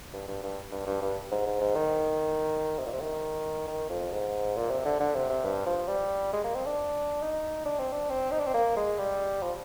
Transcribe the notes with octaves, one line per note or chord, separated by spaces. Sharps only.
G2
G2
G2
G2
G2
G2
G#2
G#2
G#2
D#3
C3
A#2
C3
D#3
D#3
F2
G#2
A#2
C3
D3
D3
C3
C3
G2
F3
G3
G#3
A#3
C4
D4
D#4
D4
C4
D4
C4
D#4
D4
C4
A#3
G#3
G3
F3